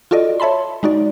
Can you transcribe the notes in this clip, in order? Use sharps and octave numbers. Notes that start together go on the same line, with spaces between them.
F4 F#4 A4 D5 D#5
C#5 E5 A5 B5 C6
G#3 D#4 F#4 D5